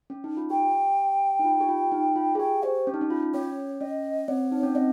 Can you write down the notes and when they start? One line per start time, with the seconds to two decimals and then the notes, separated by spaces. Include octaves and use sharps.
0.10 C#4
0.24 D#4
0.37 F4
0.50 G4 G5
1.39 D#4
1.45 F4
1.61 G4
1.69 F4
1.92 D#4
2.16 F4
2.35 G#4
2.39 G4 G5
2.63 G4 C5
2.87 C#4
2.94 D#4
3.01 C#4
3.10 F4
3.34 C#4 C#5
3.81 C#4 D#5
4.28 C4 C#5
4.52 D#4
4.63 C#4
4.75 C4 D#5